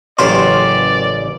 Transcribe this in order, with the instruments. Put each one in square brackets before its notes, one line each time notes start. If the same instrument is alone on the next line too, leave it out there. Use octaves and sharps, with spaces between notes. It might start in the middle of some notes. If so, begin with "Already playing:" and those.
[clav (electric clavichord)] A1 C#3 A#3 [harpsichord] F#3 G4 C5 [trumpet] D5 [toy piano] C6